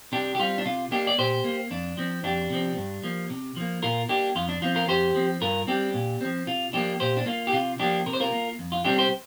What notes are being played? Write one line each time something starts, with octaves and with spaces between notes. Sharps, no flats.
C3 D4 G4
G4
G3 C4 F4
D4
C3 F4
A#3 D4 G4
D5
A#2 G4 C5
A#3
F2 D4
F3 C4
F2 D4 G4
C3 F3 C4
G2
F3 A#3
C3
F3 A#3
A#2 F4 A#4
A#3 D4 G4
F2 F4
D4
F3 C4 F4
F4 A#4
F2 G4 C5
F3 C4
G2 F4 A#4
G3 C4 D4 G4
A#2
F3 C4
C3 F4
F3 A#3 D4 G4
A#2 G4 C5
D4
A#3 F4
G4
C3 F4
F3 A#3 D4 G4
C3 A#4
C5
F4 A#4
A#3
F2
F4
C3 G3 C4 D4 G4
G4 C5